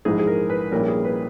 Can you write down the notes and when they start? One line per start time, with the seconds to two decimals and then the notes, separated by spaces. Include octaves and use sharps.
0.05 A#1 G#2 E3 G#3 D#4 G#4
0.19 G#4
0.27 A#4
0.50 B4
0.71 A#1 A#2 G3 C#4 E4 A#4
0.88 G#4
1.05 B4